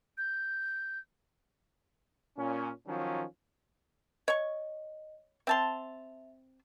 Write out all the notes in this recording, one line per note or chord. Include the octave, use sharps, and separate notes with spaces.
G6
A#2 C#4
D#3 F3 F#3 C#4 F4
C#5 D#5 C#6
C4 E5 A5 C6 F7